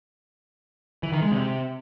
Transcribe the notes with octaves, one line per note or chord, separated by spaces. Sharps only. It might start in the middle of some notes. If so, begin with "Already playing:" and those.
E3
D#3
G#3
C3